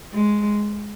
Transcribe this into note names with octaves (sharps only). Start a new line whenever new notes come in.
G#3